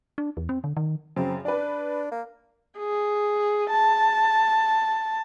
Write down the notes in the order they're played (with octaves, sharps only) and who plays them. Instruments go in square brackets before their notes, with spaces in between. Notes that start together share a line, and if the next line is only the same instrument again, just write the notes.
[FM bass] D4
E2
C4
D3
D#3
[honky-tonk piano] F#2 C#3 [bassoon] C4
[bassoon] D4 [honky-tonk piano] B4 D5
[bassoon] A#3
[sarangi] G#4
A5